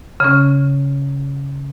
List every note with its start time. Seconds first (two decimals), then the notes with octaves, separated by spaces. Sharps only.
0.20 C#3 C#4